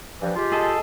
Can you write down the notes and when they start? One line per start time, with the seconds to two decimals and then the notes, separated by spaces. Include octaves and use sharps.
0.21 G2 E3 F3
0.36 G#3 F4 G4
0.52 G#4 A4 D#5